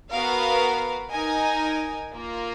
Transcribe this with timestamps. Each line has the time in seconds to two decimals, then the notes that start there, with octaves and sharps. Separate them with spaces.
0.10 B3 F#4 A#4 F5
1.12 D#4 A#4 D#5 G#5
2.14 A#3 F4 A#4